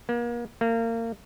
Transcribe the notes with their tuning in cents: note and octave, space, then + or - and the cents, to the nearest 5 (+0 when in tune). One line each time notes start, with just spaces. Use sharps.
A#3 +35
A#3 -30